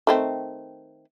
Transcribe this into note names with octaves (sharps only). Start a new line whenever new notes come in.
D#3 A3 C4